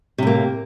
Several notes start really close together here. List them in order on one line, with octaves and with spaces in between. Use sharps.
C3 A2 A#3